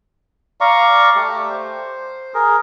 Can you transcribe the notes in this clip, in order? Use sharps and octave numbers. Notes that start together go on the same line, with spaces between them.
D5 F5 A#5 C#6
A3 G4
C5
G#4 A#4